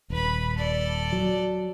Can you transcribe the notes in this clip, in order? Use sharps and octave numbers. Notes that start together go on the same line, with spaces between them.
D#1 B4 B5
A4 D5
F#3